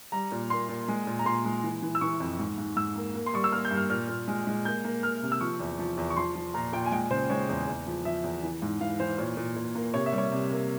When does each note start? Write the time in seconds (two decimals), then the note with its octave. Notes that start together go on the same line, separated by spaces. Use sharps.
0.12 G3 A#5
0.32 A#2
0.50 A#3 C6
0.69 A#2
0.88 G#3
1.07 A#2
1.19 A#5
1.26 A#2 C6
1.45 G#3
1.64 E3
1.82 E3
1.95 E6
2.01 E3 C#6
2.20 F2
2.39 G#2
2.58 G#2
2.76 G#2 E6
2.96 A#3
3.14 A#3
3.26 C6
3.34 G3 C#6
3.44 E6
3.52 A#3 F6
3.65 G6
3.71 G2
3.77 F6
3.90 A#2 F6
4.09 A#2
4.28 G#3
4.47 G#3
4.65 A#3 G6
4.85 A#3
5.03 A#3 F6
5.22 C3
5.32 E6
5.41 F3 C#6
5.60 E2
5.79 F3
5.97 E2
6.10 C#6
6.16 F3 C6
6.35 F3
6.54 A#2 A#5
6.73 A#2 G5
6.86 G#5
6.92 G#3 G5
7.11 C#3 C5
7.30 G#3 C#5
7.49 E2
7.67 E2
7.87 F3
8.05 F3 E5
8.24 E2
8.43 E3
8.62 G#2
8.81 E3 F5
9.00 E3 C5
9.18 A#2 C#5
9.37 A#2
9.56 A#2
9.75 A#3
9.94 C3 C#5
10.06 E5
10.12 G3
10.18 C#5
10.32 C3
10.50 A#3